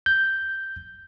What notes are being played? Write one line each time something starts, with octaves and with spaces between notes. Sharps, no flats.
G6